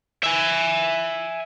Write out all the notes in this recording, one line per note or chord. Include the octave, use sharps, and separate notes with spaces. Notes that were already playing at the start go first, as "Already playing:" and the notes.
E5 G#5